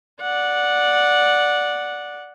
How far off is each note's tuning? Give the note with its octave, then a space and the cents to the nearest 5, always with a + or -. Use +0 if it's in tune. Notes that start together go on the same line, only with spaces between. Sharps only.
D5 +0 F#5 -10